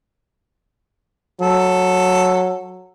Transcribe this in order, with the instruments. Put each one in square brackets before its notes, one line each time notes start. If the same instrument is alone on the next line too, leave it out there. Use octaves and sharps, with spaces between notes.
[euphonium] F#3 [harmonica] A4